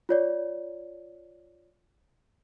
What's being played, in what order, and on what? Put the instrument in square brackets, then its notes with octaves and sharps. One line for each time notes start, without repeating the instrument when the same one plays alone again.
[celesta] F4 C#5 D5